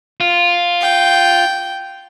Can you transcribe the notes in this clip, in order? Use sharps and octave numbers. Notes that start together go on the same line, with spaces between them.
F4
G5